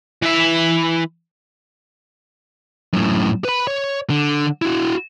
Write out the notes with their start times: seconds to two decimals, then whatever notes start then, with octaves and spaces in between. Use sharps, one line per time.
0.22 E3 E5
2.93 F#2 A2
3.45 B4 B5
3.67 C#5
4.10 D3
4.62 E4 F#4